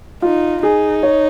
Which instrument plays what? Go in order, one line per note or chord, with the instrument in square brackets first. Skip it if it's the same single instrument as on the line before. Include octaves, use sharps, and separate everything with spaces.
[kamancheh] D#4 [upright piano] F4
[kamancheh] D#4 [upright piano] G#4
[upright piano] C#5